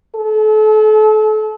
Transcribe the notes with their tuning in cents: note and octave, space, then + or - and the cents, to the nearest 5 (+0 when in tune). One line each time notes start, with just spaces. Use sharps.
A4 -35